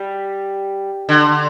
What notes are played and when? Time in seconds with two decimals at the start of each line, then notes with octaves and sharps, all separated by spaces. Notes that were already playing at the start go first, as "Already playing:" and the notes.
Already playing: G3
1.09 D3